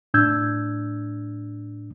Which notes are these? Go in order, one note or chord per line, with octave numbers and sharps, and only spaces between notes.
A2 D4 E6 G6 G#6